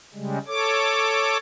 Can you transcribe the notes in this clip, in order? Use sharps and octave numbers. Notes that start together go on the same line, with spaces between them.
C#3 G3 G#3
A4 C#5 D6